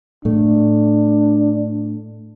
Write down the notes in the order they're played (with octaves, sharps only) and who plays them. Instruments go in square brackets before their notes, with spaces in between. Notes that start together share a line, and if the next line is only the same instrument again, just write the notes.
[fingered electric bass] A2 A3 [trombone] D4